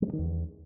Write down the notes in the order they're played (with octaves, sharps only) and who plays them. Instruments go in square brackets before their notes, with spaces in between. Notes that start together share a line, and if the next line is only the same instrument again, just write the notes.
[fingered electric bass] G3
G2
D#3
E2